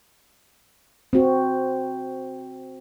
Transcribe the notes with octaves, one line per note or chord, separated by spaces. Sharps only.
C4 F#4